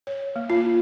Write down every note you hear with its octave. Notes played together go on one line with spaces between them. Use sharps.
C#5
A#3
F4